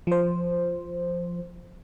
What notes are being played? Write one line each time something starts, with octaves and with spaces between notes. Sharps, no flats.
F3 C5